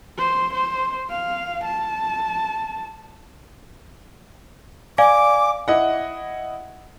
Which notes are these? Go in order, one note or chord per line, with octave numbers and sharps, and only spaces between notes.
C5
C5
F5
A5
D5 F5 G#5 D6
E4 D#5 F#5